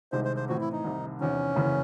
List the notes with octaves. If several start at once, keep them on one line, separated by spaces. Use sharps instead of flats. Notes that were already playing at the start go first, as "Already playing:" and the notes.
C2 C3 D#3 G#3 C4 C5
C5
C5
A2 E3 C4 F#4
E4
D#4
C2 C3 D#3
E2 C3 D#3 C#4
F#1 E2 C#3 E3